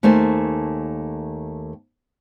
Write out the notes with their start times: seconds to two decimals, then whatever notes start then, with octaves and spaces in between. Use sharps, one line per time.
0.03 D#2 A3 A#3 C5 G#5 A5